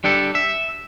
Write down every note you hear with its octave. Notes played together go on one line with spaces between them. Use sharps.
G3 D4 G4 A4
E5